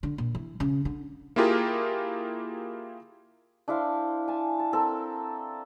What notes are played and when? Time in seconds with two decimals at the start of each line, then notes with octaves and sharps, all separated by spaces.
0.03 D3
0.18 A#2
0.35 E3
0.60 C#3
0.85 D3
1.36 A#3 E4 F4 G4 G#4 A#4
3.68 D4 E4 C5 F5
4.28 G#5 A5
4.59 A5
4.73 C4 A4 A#4